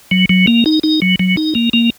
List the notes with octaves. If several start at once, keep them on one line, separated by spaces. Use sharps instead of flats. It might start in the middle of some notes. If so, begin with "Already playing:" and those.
F#3
F#3
A#3
D#4
D#4
F#3
F#3
D#4
A#3
A#3